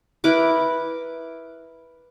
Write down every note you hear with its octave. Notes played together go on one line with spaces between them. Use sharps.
E4 A#4 B4 D6